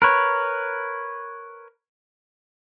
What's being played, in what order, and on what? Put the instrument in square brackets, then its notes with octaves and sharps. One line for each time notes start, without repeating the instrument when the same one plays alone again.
[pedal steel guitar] A#4 B4 C#5